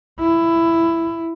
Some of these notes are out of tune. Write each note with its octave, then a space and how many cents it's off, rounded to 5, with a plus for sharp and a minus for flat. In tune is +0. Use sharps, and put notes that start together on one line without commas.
E4 +10